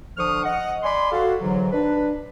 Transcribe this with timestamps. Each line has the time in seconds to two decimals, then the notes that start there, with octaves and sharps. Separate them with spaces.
0.18 D3 F3 C5 C#6 D#6 F6
0.44 D#5 F#5
0.83 D5 G#5 B5 C6
1.12 F#4 A4 F5
1.41 G#2 D3 E3 F#3
1.72 D4 B4